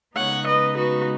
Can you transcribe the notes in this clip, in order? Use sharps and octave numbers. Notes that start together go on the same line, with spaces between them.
C#3 G#3 B3 D#4 C#5 F#5
B4 D#5
F#4 B4